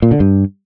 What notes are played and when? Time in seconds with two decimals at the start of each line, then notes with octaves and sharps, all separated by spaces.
0.02 A#2
0.11 D3
0.20 G2